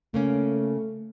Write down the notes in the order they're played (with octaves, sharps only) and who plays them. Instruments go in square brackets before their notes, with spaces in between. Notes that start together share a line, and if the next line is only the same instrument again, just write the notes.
[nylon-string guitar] C#3 A#3 C#4 [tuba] A3